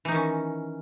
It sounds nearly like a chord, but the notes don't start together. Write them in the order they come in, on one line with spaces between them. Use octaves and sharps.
E3 D#4 D#3 C#4